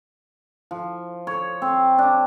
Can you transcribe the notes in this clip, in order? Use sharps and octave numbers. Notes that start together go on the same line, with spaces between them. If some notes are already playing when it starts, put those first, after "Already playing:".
F3
C#5
C4
D4